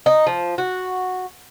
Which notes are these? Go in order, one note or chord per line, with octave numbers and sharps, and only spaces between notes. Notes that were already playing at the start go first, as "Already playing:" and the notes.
D#4
F3
F#4